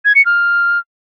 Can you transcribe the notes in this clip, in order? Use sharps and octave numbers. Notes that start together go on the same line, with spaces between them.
G#6
C#7
F6